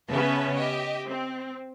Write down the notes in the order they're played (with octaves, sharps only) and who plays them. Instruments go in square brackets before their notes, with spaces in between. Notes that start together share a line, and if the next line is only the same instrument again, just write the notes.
[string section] C#3 B3 C#4 B4 E5 A5
G4 D#5 E5
C4